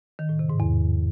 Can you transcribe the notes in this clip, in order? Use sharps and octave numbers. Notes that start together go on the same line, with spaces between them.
D#3
A2
C3
G#2
E2